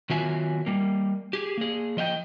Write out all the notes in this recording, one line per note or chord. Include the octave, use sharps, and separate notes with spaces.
D#3 F#3 B3 F4 E5 G#5
G3 A#3
G4 G#4
A#3 G#4
F3 D#5 F5 G5